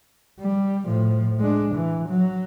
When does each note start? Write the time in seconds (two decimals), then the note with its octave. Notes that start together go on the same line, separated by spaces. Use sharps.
0.40 G3
0.86 A2 F3
1.40 G#3 D4
1.75 E3
2.09 F#3